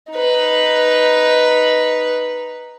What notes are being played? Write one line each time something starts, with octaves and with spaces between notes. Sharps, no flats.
D#4 B4